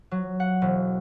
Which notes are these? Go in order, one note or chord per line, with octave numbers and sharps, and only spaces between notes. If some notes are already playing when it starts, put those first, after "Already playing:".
F#3
F#5
E1